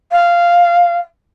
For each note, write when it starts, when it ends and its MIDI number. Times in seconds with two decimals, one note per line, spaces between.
0.12 0.96 77